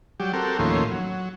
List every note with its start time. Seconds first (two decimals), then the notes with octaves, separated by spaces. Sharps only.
0.20 F#3 G3 G4
0.33 C4 F#4 G4 A4 A#4
0.59 D#2 A2 F3 A#3 C#4 C6
0.91 F#3